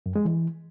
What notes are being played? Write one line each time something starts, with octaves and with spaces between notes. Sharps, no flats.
F#2
G#3
E3